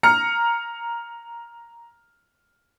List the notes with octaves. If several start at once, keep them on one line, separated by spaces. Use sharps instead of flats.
A#5 F6 C#7